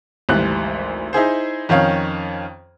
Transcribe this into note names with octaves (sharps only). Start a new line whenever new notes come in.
G#1 D2 E3 G3 F#6
D#4 E4 G#4 C5
F2 D#3 C#4 C#5 F5